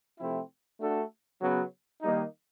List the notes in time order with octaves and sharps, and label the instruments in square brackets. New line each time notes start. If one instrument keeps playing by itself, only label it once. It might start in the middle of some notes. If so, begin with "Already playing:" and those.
[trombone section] C3 F3 A3 C4 E4
A3 D4 F#4 A4
C#3 F#3 B3
D#3 G3 A#3 D#4